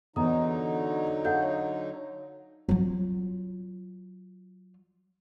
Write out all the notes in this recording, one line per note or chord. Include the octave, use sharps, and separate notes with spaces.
E2 D3 F#3 D#4 D#5 A#5 D#6
A4 F5 F#5 G6
C#5
F#3 F4